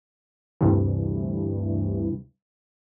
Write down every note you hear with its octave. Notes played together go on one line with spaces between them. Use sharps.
D2 G2 C3 E3